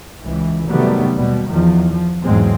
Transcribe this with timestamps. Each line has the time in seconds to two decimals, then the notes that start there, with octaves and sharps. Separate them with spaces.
0.23 C#2 E3
0.68 C3 D#3 F#3 G3 A3 B3
1.16 D#2 B2 G3
1.50 E2 D#3 F3
1.92 F3
2.23 B1 E2 G#2 F#3 G#3 C4